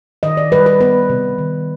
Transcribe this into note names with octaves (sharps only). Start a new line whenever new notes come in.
D#3 D#5
D5
G3 B4
B4
B3 B4
C3
D#3